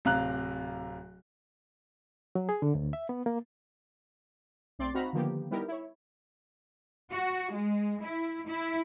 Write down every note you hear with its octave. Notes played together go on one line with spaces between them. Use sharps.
D1 C3 F5 A#5 F#6
F#3
G#4
D3
D2
E5
B3
A#3
B1 A3 C4 D5 C6 A6
C4 D#4 F#4 F5 A#5 B5
D3 D#3 F3 A#3 B3 G4
G3 B3 D#4 E4 G4 A#4
E4 C#5
F#4
G#3
E4
E4